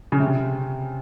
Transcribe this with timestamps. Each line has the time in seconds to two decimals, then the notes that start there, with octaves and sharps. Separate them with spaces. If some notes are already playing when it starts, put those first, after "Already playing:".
0.12 C#3
0.20 C3